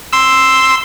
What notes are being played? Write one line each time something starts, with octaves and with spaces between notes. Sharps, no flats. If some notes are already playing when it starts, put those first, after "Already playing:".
C6 E6